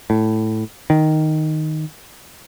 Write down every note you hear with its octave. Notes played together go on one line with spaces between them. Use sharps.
A2
D#3